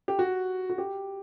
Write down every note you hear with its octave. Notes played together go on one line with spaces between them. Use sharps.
G4
F#4
F#4
G4